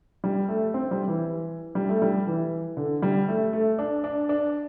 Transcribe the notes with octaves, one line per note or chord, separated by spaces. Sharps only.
G3
A3
C4
G3
E3
G3
A3
G3
E3
D3
G3
A3
A3
D4
D4
D4